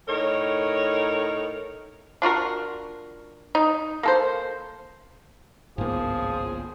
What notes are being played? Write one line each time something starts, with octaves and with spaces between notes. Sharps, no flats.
A2 D#4 A#4 C#5
D4 F4 F#4 A#4
D#4
A#3 A4 C5
G1 C2 G#2 F3 A#3 B3 G#4